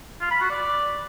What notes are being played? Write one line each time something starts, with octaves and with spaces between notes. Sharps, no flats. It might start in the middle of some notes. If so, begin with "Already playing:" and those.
F4
B5
F#4
D5